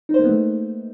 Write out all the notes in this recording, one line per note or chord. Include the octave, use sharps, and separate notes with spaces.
D#4
C5
A#3
B3
A3